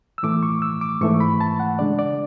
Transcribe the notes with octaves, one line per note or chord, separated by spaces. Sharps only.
E6
A2 E3 A3 D6
C#6
E6
D6
G#2 E3 A3 C#6
B5
A5
F#5
C#3 G#3 D4 D5
D5